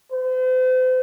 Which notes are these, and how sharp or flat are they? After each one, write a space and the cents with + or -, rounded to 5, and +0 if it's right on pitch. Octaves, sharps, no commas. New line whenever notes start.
C5 -40